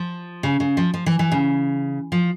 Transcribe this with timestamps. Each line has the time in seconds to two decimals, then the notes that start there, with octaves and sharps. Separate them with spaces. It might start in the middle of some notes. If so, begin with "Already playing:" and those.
Already playing: F3
0.43 C#3
0.60 C#3
0.77 F3
0.94 F3
1.06 E3
1.19 E3
1.32 C#3
2.12 F3